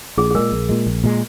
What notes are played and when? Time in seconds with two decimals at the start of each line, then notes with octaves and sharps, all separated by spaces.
0.17 A#1 G#4
0.31 G#4
0.35 A#2 G#3 A#4
0.52 A#1
0.69 A#2 G#3
0.86 A#1
1.04 A#2 G#3